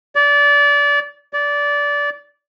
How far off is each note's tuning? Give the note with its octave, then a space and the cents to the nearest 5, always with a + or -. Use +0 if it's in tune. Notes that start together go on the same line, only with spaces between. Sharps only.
D5 -25
D5 -20